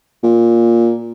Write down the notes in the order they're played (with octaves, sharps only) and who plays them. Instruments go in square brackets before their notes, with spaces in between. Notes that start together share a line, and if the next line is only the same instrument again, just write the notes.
[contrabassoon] A#2